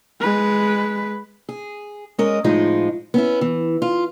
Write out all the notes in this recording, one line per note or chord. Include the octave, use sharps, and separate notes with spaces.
G#3 B4
G#4
G#3 C#4 A#4 D#5
A2 F3 G#3 D#4 F4
B3 C#4 E4
E3
F4